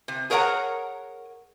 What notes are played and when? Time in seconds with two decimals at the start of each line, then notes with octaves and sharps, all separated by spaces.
0.08 C3
0.30 G#4 A#4 C#5 D#5 F#5 A#5